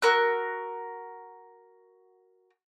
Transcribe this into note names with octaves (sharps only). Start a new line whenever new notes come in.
F#4 A#4 E6 F#6